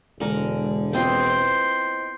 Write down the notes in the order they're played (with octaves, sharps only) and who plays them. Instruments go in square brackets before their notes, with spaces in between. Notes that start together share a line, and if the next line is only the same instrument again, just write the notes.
[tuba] E1 [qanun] D3 A#4 [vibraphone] G#3
[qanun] B3 C4 F4 [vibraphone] E4 C5 D#5 [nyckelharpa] G5 C6